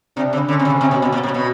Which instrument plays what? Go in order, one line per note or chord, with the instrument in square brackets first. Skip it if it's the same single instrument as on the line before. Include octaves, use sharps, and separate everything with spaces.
[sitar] C3 [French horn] D4
[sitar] C#3
[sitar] D3 [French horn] C#4
[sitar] C3
C#3
C3
B2
B2
A#2
A#2
B2